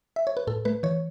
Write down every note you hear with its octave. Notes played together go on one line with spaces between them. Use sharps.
E5
C#5
B4
A2 A4
A3 B4
E3 C#5